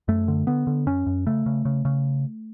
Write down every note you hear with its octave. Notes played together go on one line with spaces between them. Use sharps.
F#2 A3
D3
D3 B3
D3
F#2 C#4
F#2
C#3 A3
C#3
C#3
C#3